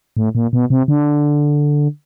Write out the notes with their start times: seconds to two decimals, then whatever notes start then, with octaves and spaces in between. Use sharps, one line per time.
0.17 A2
0.35 A#2
0.53 B2
0.70 C3
0.88 D3